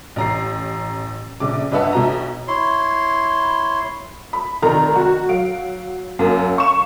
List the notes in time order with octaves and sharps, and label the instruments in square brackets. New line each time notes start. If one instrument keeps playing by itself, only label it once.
[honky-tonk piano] A1 A#5 C7
A#1 C#3 D6
G1 B4 D#5 E5 F#5 A5
B1 B2 A#5
[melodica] E4 C#5 C6
[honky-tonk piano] B5
F1 D#3 A#5
F#4
F#3 F5 D7
F#2 F#3 A#3
F5 C#6 E7